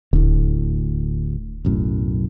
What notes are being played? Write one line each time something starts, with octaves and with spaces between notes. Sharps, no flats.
D#1 D2 A2
B1 F#2 A2